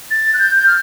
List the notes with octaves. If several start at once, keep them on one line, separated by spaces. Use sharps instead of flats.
A6
F#6
G6
F6